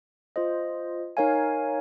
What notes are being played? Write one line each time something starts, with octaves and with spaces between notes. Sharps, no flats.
F4 C5 D#5
D#4 A#4 C#5 F5 G#5